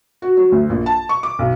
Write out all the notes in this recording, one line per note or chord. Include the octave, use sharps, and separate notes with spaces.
F#4
F#3
D2
A#1
A5
C#6
D6
B1